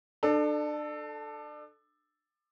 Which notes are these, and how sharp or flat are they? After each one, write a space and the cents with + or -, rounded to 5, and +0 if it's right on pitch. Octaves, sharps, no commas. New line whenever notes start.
D4 +30 A4 +0